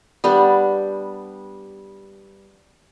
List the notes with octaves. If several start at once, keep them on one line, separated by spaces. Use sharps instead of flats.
G3 B3 D4